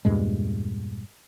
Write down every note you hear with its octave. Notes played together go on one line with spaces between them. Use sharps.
E2 G2 A#2 G#3